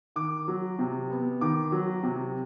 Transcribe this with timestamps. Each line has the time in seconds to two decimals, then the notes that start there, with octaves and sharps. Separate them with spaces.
0.16 D#3 D6
0.48 F#3
0.79 C3
1.10 B3
1.41 D#3 D6
1.72 F#3
2.03 C3